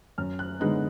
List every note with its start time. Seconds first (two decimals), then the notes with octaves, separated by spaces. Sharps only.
0.18 F#2 F6
0.39 F#6
0.60 D3 G#3 B3 D#4 F#6